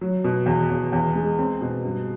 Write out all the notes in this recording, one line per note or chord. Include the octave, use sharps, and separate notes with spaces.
F#3
B2
E2
E2
E2
G#3
C4
B2
G2